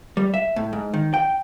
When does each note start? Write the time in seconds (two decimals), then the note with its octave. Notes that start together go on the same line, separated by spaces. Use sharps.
0.17 G3
0.34 E5
0.56 A2
0.73 G#2
0.94 D#3
1.14 G5